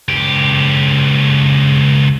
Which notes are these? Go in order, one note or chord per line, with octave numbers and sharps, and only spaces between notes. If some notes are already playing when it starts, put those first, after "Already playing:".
C#2 G4